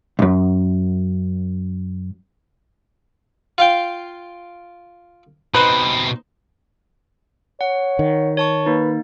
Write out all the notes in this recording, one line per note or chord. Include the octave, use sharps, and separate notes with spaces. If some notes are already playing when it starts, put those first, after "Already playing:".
B1 F#2
F4 F5 G5
B2 C4 D#4 B4 C5
C#5 F#5
D#3
C#5 A5 C#6
A#3 D#4 B4